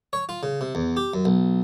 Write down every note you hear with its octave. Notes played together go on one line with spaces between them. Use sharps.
C#5
F4
C#3
C3
E2
G4
F#2
B1